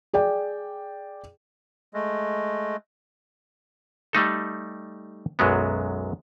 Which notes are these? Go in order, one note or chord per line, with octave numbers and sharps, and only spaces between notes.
G#4 D5 G5
G#3 A3
G3 A3 D#4 A4
B1 F#2 F#3 G#3 B3